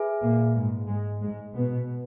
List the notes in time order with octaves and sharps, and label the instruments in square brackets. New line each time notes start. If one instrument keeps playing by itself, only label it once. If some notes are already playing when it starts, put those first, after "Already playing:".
Already playing: [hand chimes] G#4 B4 E5 G#5
[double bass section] A#2 A#3
G#2 G#3
G#2 G#3
G#2 G#3
B2 B3